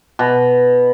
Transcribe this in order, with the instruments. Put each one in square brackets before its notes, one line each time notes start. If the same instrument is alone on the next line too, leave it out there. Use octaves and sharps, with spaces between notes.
[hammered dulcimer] B2